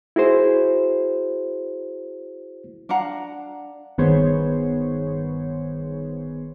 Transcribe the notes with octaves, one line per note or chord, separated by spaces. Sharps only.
E4 F#4 G#4 C5
D4 F5 F#5 A#5
G1 D#3 B3 G#4 C5 C#5